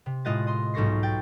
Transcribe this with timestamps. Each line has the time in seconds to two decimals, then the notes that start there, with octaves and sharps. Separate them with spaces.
0.06 C3
0.25 A2 G#3 F4 D#5 F#6 A6
0.47 D#5 C6
0.74 B1 G#2 A4 C#6 A#6 C7
1.03 G5 A6